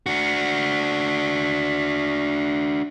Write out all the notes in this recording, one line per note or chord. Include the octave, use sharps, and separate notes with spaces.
D4 F#4